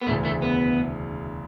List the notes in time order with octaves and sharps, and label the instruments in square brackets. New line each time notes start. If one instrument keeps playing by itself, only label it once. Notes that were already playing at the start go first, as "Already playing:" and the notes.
[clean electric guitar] B3
[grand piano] E1 D2 C#3 E3 [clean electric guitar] A3
[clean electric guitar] A3
B3